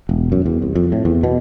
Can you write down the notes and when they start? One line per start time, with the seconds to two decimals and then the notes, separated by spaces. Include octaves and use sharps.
0.09 E1
0.32 F#2
0.46 E2
0.62 C2
0.75 F2
0.92 A2
1.05 E2
1.23 B2